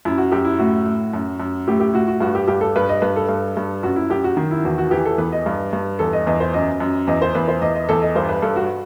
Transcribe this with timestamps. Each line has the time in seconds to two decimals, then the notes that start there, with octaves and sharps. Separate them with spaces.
0.05 F#2 E4
0.18 F#4
0.32 F#2 G4
0.45 E4
0.59 A2 F#4
0.86 A2
1.13 F#2
1.40 F#2
1.68 A2 G4
1.80 G4
1.93 A2 F#4
2.08 F#4
2.20 G2 F#4
2.35 G4
2.47 G2 G4
2.61 A4
2.76 G2 B4
2.89 D#5
3.02 G2 B4
3.16 A4
3.29 G2
3.57 G2
3.83 F#2 F#4
3.96 E4
4.10 F#2 G4
4.24 F#4
4.37 D#3
4.51 E4
4.65 E2 F#4
4.78 F#4
4.91 E3 G4
5.06 A4
5.18 E2 B4
5.32 D#5
5.46 G2
5.73 G2
5.99 E2 A4
6.13 D#5
6.27 E2 D#5
6.40 C5
6.54 F#2 D#5
6.80 F#2
7.07 E2 D#5
7.22 C5
7.35 E2 B4
7.48 C5
7.62 E2 D#5
7.75 D#5
7.89 E2 A4
8.02 D#5
8.15 G2 C5
8.29 B4
8.42 G2 A4
8.56 F#4